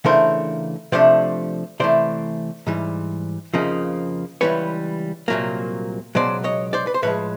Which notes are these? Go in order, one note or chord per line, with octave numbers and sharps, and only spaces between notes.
C#3 E3 A3 D4 A#4 C5
C3 F3 A3 D4 C5 D5
C3 E3 A3 C5 D5
G#2 E3 G3
F2 C#3 F3 A#3 D#4
C#2 C3 E3 G3 B4 C#5
C2 A#2 F#3 A#3
C#2 B2 F#3 C5 D5
C#5 D#5
C5 D5
B4
C5
A2 F3 G#3 B4 C#5